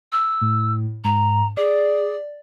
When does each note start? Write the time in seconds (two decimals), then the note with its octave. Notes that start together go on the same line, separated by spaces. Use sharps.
0.12 E6
0.41 A2
1.04 G#2 A#5
1.57 G#4 D5